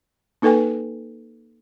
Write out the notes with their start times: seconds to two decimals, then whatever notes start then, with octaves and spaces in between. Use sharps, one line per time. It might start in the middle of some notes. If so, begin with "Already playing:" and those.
0.42 A#3 D#4 A4 B4 G5 G#5